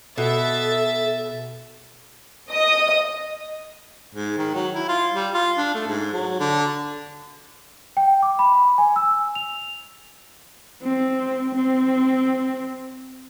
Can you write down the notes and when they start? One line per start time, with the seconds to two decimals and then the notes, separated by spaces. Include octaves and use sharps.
0.18 B2 A4 E5 A6
2.50 D#5 D#6
4.15 G#2
4.37 D#3
4.55 F#3
4.75 E4
4.88 F4
5.15 G3
5.34 F4
5.57 D4
5.75 A3
5.88 G#2
6.13 F#3
6.40 D3
7.97 G5
8.22 D6
8.39 B5
8.78 G#5
8.96 E6
9.35 F7
10.83 C4
11.55 C4